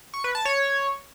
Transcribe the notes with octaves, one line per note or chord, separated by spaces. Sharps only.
C#6
B4
A5
C#5